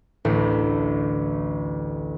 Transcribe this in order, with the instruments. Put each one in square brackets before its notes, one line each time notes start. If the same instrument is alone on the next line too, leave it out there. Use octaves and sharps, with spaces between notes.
[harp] A1 D2 A2